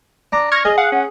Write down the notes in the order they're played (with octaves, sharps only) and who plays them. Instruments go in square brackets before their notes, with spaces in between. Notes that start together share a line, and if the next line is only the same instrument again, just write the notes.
[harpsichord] D4 [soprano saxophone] A#5
[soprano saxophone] C#6 [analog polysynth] F6 G#6 A#6
[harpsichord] G#4 [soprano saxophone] D#5
[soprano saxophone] F5 [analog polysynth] F#5
[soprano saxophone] C#4